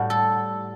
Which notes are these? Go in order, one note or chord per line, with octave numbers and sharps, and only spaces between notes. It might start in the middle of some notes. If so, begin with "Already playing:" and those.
Already playing: A2 G3 F#4
A4